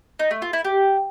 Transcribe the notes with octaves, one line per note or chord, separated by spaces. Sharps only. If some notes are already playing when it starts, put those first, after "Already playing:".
D#4
A3
F4
E4
G4